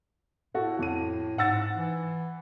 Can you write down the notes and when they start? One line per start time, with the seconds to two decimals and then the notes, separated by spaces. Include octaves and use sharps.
0.54 A2 F#4 A4
0.79 F2 D#7
1.38 G#2 F#5 E6 A6
1.74 E3